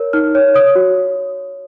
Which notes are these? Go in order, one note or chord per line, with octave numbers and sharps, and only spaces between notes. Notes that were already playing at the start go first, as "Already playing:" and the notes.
Already playing: A#4 C#5
D#4 F6
C#5
C#5 D#6
F#4